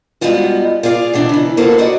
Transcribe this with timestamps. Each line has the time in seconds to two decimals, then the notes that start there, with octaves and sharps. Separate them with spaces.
0.21 G3 G#3 B3 D#4 F4 F#4
0.83 F4 G#4 D5 F5
1.13 B2 E3 D4 D#4
1.29 C#3 E3
1.57 A#3 F4 F#4 A4 B4 C5
1.78 D#4 F#4 D5 D#5